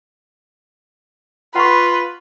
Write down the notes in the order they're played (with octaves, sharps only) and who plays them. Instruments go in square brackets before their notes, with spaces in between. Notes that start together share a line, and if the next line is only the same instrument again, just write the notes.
[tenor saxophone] F4 [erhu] B4 [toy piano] F#5 B5 C#6